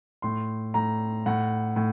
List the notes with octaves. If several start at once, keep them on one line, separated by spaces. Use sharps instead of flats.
A2 C6
A2 A#5
A2 F#5
A2